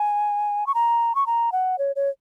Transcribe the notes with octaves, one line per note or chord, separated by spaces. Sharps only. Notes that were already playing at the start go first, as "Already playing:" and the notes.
Already playing: G#5
C#6
A#5
C#6
A#5
F#5
C#5
C#5